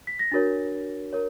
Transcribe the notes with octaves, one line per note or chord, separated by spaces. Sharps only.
B6
A#6
D4 F#4 A#4 C#5 A6
A#4 C#5